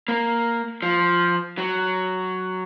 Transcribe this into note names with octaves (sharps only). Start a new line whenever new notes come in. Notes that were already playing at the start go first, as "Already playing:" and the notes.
A#3
F3
F#3